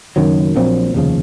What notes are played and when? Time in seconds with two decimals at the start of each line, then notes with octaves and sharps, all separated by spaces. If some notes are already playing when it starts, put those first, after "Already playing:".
0.16 F#1 F#2 D#3 F#3
0.56 A#1 A#2 F#3 C4
0.94 F1 D#2 C#3 F3